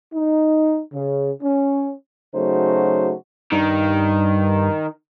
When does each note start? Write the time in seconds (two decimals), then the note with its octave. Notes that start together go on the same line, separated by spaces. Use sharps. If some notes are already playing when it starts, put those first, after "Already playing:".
0.13 D#4
0.93 C#3
1.43 C#4
2.34 C#3 F#3 A3 D#4 F#4 C5
3.52 G2 D#3